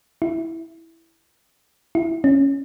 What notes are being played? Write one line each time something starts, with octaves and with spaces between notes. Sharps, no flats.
E4
E4
C#4